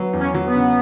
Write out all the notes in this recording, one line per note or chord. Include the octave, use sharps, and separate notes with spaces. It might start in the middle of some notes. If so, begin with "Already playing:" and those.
Already playing: F#3 B3
E2
C#4
F#3
B3
C#3